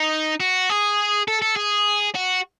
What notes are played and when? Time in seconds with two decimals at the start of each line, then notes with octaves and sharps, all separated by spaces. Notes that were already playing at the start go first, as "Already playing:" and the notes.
Already playing: D#4
0.40 F#4
0.70 G#4
1.28 A4
1.42 A4
1.56 G#4
2.15 F#4